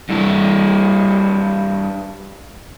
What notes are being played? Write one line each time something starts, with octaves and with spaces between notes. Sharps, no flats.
G2 E4